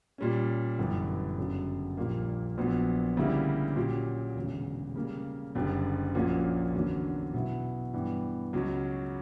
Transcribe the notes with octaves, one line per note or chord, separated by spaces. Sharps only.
A#2 G3 C#4
G1 F#2 E3
G1 F#2 C#3 F#3
A#1 A#2 G3 A#3
A#1 A#2 F#3 B3
D2 C#3 G3 A#3 E4
A#2 F#3 C#4 G4
E1 D2 C#3
C#3 G3 A#3
F#1 F#2 D3 G3
A#1 A#2 A#3 C#4 F#4
E2 D3 F#3 A#3 C#4
B2 F#3 B3 E4
G2 E3 B3
C#2 C#3 F#3 C#4